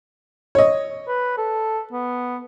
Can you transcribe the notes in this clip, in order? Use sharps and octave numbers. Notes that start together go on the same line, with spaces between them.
C#5 D#5
B4
A4
B3